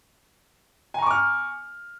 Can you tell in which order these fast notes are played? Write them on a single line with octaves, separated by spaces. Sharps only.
G#5 A#5 C#6 D6 F6